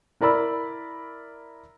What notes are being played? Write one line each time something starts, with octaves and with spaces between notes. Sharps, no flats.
E4 A#4 D5 B5 E6